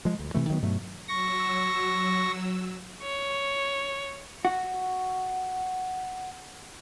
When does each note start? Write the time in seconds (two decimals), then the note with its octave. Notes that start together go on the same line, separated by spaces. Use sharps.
0.05 F3 G#3
0.19 D2
0.34 C3 E3 A3
0.49 D#3 F#3 A#3 B3
0.62 G2 B2 F#3 A3
1.08 F#3 C#6 E6 A#6
3.03 C#5
4.45 F#4 F#5